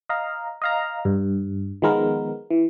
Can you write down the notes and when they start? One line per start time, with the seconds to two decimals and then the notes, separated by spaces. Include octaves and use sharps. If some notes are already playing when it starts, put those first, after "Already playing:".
0.09 D#5 F5 A#5
0.62 D#5 F5 A#5
1.05 G2
1.82 D#3 F3 G#3 B3 A#4
2.51 E3